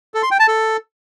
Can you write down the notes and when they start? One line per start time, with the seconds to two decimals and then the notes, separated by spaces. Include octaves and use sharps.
0.14 A4
0.23 C6
0.31 G5
0.40 A5
0.48 A4